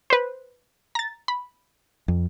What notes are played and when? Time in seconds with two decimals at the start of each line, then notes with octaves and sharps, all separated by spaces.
0.10 B4 C5
0.95 A#5 A6
1.28 B5
2.08 F2